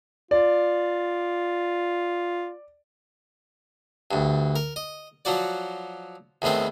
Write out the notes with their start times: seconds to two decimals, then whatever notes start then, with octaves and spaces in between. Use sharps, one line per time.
0.31 F4 D5
4.11 D2 G2
4.56 A#4
4.76 D#5
5.25 F3 F#3 F#4 D5
6.42 E2 A2 D#3 C4 B4